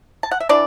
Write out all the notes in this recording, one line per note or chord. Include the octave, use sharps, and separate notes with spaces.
A5
F#5
E5
E3 D4 D5